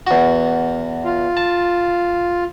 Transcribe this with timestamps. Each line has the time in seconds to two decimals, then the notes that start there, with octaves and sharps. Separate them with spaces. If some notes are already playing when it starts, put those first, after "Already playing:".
0.07 E2 F#4
1.05 F4
1.37 A5